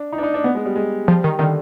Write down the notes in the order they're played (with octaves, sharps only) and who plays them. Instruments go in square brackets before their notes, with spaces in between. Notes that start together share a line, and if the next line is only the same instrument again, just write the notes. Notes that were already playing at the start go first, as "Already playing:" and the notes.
Already playing: [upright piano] D4
D#4
D4
D#4
D4
B3
G#3
G3
G#3
[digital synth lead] F3 [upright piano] G3
[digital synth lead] D#3
[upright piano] D3 [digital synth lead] D#3